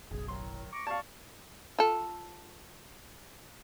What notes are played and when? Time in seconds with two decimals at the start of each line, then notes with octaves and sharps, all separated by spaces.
0.11 F#1 B1 G#4
0.28 A2 D#3 F#3 C6
0.71 A#5 C#6 D6
0.87 D5 F5 A5 C#6
1.79 F4 A4